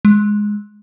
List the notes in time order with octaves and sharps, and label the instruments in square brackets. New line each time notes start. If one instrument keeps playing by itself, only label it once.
[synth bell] G#3